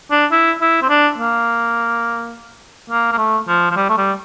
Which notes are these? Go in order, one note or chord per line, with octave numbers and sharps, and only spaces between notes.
D4
E4
E4
C4
D4
A#3
A#3
A#3
A3
F3
F3
G3
A3
G3